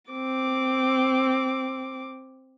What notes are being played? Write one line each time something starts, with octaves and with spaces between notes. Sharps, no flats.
C4 D6